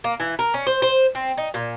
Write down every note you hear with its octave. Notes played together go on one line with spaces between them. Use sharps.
A#3
E3
A#4
C#4
C5
C5
C4
D#4
A#2